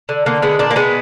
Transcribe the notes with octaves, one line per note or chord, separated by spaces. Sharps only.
D3
D3 A#3
G#3 B3
A#2 D4
A#3
G#3 B3